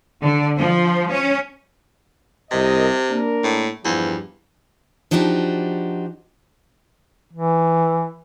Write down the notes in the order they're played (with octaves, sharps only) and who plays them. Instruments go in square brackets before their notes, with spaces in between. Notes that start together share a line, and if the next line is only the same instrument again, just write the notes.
[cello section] D3
F3
C#4
[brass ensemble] C2 A#4 D#5 [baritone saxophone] C3
[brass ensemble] A#3 D4 A#4
[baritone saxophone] A2
[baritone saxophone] E2 [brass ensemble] G2 F3 G3
[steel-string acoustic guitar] F3 D4 D#4 F#4 G4
[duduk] E3